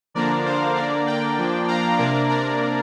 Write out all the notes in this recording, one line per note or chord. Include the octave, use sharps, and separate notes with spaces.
D3 F3 A#3 D4 A#4 D5
C5 F5
D3 A#3 D4 A#4 D5
D5 G5
F3 A#3 D4
F5 A#5
C3 A#3 D4 A#4 D5
A#4 D5